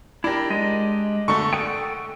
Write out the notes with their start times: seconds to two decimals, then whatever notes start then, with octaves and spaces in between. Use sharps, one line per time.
0.24 D4 E4 G4 A#4
0.50 G#3 D#5
1.28 D3 A3 C#6
1.53 A4 F#5 G5 D#6